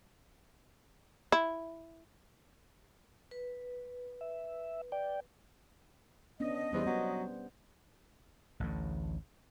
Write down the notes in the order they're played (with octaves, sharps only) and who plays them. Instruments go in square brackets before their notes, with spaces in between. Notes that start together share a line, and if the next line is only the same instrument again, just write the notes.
[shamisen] E4
[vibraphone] B4
[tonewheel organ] E5
D5 G5
[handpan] B3 C#4 D4 [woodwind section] D#5
[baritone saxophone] E2 [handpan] G3 C5
[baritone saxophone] F#3 [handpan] B3
[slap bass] A1 D2 A2